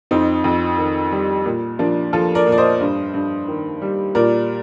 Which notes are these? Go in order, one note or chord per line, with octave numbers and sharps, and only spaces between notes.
F2 C4 D#4
F2
D#3
G3
A#2
F3 A#3 D4
F3 F4 A4
A#4 D5
A#2
D5
C5 D#5
G2
G2
D#3
G3
A#2 A#4 D5